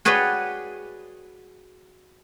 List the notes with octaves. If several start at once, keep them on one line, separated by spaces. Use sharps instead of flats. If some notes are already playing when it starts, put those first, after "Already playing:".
F#4 G#4 B4 C#5 D5 G5